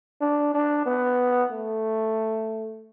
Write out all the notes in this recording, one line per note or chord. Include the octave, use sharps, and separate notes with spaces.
D4
D4
B3
A3